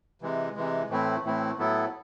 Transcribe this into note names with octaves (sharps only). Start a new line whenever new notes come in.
C3 E3 G#3
C3 E3 G#3
A2 E3 A3 C4 E4
A2 E3 A3 C4 E4
A2 F#3 B3 E4 A4